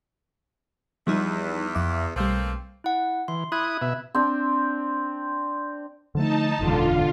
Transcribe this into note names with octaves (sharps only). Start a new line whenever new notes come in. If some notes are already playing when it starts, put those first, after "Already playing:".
E2 F3 G3 D#4
F2 E5 D6
B1 G3 A3 A#3 C4
E4 F#5
E3 C6
E4 B5 D#6 F#6 G#6
B2 E5
C4 D4
D3 F3 A3 D#4 A5
F#1 E2 G#2 B2 D3 F4